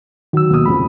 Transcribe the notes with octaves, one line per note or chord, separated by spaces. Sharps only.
D#3 F#3 F#4 E6
D#2 B2 D#6
A1 F2 C#3 B5